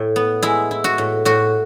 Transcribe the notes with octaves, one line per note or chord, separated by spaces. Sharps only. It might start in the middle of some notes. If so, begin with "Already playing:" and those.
Already playing: A2 E4
B3
G#3 E4
E4
F#4
A2
A2 F#4